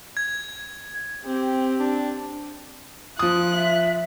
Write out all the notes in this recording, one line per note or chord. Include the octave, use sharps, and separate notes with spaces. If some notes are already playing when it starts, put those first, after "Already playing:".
G#6
C4 G4
D4
F3 F4 D#6 F#6
E5